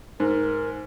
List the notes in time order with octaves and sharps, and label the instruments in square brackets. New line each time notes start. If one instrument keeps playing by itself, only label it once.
[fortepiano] G#2 [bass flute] A#4